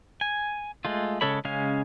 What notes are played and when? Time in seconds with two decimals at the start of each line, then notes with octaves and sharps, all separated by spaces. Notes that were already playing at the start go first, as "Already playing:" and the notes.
0.21 G#5
0.85 G#3 A3 F4
1.21 C#3 G#3 A4 C#5 B5
1.45 C#3 G#3 C#4 F5 G#5